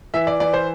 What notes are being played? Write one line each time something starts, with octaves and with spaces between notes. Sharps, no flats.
E3 E5
D5
E3 D5
C5